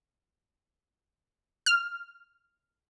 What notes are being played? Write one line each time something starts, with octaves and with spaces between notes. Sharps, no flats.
F6